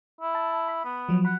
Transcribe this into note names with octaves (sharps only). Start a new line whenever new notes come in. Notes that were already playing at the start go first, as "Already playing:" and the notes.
E4
A5
B5
B3
F3 F#3
F#5 B5